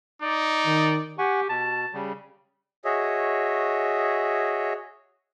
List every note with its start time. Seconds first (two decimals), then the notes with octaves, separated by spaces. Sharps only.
0.22 D#4 D5
0.66 D#3
1.18 G4 F#5 G#5 C#6
1.49 B2 A5
1.94 C#3 G3
2.85 F#4 G#4 C#5 D#5 E5